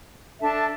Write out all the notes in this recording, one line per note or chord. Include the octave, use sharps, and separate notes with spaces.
D4 A4 E5 A5